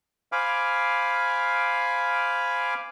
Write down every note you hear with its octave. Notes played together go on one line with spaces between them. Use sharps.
C5 F5 G#5 B5 D6 F6